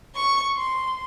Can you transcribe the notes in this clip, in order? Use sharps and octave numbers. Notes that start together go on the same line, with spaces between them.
C#6
C6